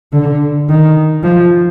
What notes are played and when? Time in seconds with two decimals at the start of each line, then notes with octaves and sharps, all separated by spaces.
0.13 D3
0.69 D#3
1.23 F3